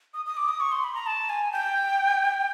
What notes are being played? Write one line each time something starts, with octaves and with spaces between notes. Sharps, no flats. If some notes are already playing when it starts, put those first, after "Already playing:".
D#6
D#6
D6
D#6
C#6
C6
B5
A#5
A5
G#5
G5